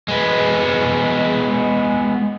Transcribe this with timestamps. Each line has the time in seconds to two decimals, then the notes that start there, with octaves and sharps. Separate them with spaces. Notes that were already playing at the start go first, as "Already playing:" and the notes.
0.08 G#3 B3